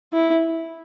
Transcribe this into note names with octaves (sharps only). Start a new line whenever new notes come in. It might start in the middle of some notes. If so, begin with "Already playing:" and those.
E4